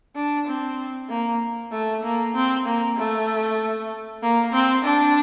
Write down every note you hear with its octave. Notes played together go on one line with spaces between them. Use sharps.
D4
C4
A#3
A3
A#3
C4
A#3
A3
A#3
C4
D4